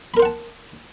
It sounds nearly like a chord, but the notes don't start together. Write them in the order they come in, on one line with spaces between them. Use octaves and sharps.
B5 A#4 C5 F#5 A5